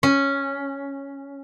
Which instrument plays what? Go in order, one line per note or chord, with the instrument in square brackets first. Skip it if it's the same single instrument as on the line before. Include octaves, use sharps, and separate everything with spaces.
[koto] C#4